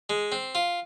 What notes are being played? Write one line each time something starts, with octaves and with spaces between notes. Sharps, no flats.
G#3
C4
F4